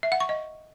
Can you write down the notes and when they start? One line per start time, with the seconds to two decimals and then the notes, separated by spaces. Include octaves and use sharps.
0.03 E5
0.12 F#5
0.20 C#6
0.29 D#5